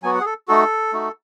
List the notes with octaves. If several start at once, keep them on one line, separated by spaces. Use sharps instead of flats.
F#3 B3 F#4 G#5
F#5
G#4
A4
A3 D#4 F#4 A4
A3 D#4 F#4